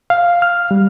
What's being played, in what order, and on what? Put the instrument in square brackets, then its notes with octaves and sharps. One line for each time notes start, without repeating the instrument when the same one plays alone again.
[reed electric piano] F5
F6
G3